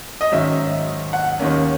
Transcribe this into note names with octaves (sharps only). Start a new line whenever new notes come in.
D#5
G#2 D#3 F#3 C#4 E5
F#5
D#2 D#3 A#3 C#4